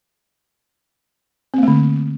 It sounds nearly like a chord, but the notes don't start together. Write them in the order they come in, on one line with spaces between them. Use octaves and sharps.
C4 A#3 A3 D3